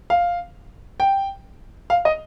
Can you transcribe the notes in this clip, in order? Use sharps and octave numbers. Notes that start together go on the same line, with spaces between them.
F5
G5
F5
D#5